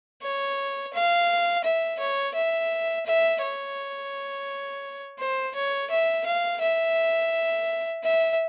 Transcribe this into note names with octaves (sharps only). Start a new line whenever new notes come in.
C#5
F5
E5
C#5
E5
E5
C#5
C5
C#5
E5
F5
E5
E5